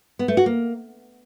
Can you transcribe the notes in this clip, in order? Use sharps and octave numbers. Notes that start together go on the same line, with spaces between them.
B3
A3
F#4
A#3